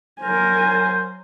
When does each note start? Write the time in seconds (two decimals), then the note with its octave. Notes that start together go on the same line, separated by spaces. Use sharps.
0.22 F#3 A#4 C5 G#5